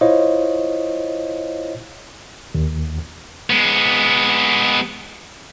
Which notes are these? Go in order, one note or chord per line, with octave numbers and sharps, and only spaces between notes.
E4 F4 C5 C#5 D#5 F5
D#2
G#3 B3